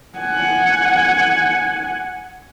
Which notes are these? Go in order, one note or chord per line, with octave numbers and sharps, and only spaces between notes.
F#5 G#5